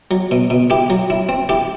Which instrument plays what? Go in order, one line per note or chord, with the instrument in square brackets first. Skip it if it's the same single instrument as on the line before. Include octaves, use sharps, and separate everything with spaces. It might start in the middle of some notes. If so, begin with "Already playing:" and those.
[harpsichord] F#3
B2
B2
E4 G4
F#3
E4
C4
E4 G4